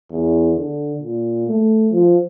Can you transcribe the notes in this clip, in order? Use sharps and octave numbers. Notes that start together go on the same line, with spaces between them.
E2
D3
A#2
A3
F3